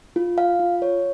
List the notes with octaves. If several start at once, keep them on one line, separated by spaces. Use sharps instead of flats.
F4
F5
F4
C#5